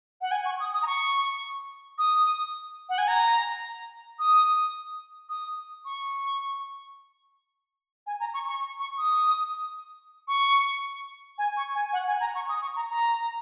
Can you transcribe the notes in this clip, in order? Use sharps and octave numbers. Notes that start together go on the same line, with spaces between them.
F#5
G#5
C#6
D#6
D#6
A#5
C#6
D#6
F#5
G#5
A#5
D#6
D#6
C#6
G#5
A#5
C#6
C#6
C#6
D#6
C#6
G#5
C#6
G#5
F#5
G#5
A#5
C#6
D#6
C#6
A#5
A#5